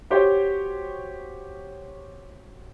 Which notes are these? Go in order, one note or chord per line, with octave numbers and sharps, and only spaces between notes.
F#4 G4 C5 C#5 G5